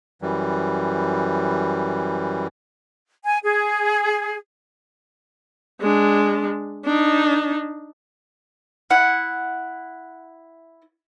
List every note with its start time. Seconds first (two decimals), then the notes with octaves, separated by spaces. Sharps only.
0.22 F#2 E3 G3
3.25 G#5
3.43 G#4
5.81 G#3 D4
6.85 D4 D#4
8.90 E4 F#5